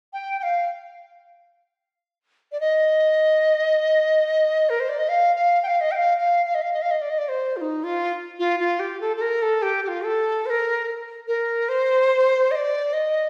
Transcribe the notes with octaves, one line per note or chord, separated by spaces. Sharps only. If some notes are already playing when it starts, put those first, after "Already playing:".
G5
G5
F5
D5
D#5
A#4
C5
D5
D#5
F5
F5
G5
F5
D#5
G5
F5
F5
F5
D#5
F5
D#5
F5
D#5
D5
D#5
D5
C5
F4
D#4
F4
F4
F4
G4
A4
A4
A#4
A4
G4
G4
F4
A4
C5
A#4
A#4
C5
D#5
D5
D#5